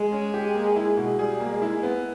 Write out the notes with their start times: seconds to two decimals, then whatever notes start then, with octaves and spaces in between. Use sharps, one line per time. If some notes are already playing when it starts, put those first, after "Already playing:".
Already playing: G#3
0.12 C#4
0.34 G4
0.55 A#3
0.76 E4
0.97 B2
1.19 G3 G#4
1.40 A#3
1.51 G#3
1.62 E4
1.83 B3